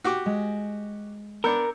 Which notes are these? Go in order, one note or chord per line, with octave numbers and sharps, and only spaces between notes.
F#4 G4 D6
G#3
B3 D4 A#4 E6 G6 C#7